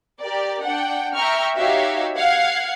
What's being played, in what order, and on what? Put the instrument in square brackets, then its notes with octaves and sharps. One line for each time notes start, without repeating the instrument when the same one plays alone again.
[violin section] G4 A#4 D5
D4 F#5 G5
E5 G5 A#5 C#6 F6
D#4 F#4 G4 C#5 E5 F5
F5 F#5 G#6 C7